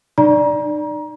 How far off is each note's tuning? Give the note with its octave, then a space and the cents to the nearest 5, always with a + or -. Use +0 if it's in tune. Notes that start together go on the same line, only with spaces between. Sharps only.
D#4 -45 D5 +0 A#5 +30